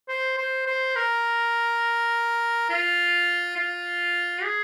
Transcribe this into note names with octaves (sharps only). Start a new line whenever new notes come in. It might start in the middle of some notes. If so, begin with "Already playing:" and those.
C5
C5
C5
A#4
F4
F4
G#4